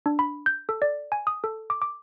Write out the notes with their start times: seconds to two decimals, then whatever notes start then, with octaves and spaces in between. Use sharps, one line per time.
0.06 D4
0.19 B5
0.46 G6
0.69 A4
0.82 D5
1.12 G#5
1.27 D#6
1.44 A4
1.70 D6
1.82 D6